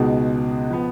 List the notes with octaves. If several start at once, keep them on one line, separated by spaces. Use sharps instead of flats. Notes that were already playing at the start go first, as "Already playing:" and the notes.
Already playing: C#2 B2 G#3 D#4 F#4
F3 B3